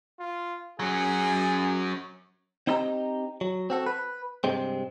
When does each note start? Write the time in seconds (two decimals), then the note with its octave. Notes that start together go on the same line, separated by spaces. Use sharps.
0.19 F4
0.79 F#3 C#4 G#4
2.67 C4 D#4 E4 G4 D#5 A#5
3.41 F#3
3.70 C4 F#4 A4
3.86 B4
4.44 G2 C3 G#3 C4